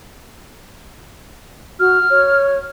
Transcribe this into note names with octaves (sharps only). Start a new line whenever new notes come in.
F#4 F6
C#5